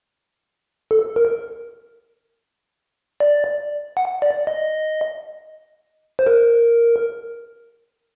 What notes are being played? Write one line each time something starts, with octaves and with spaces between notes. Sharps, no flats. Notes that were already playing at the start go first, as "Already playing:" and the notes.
A4
A#4
D5
F#5
D5
D#5
C5
A#4